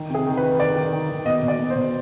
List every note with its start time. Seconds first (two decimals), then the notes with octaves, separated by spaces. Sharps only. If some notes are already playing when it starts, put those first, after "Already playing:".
Already playing: D#3
0.10 C3 G#4
0.26 D#3
0.37 B4
0.43 D#3
0.59 D#3 D5
0.76 D#3
0.93 D#3
1.09 D#3
1.26 B2 D#5
1.42 B2
1.48 D5
1.59 B2
1.70 C5
1.76 B2